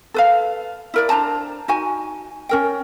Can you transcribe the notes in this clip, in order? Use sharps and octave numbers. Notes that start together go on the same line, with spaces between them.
A4 B4 F5
E4 A#4 D5
D4 C5 A5 A#5
D#4 F#4 G#5
C#4 A#4 G5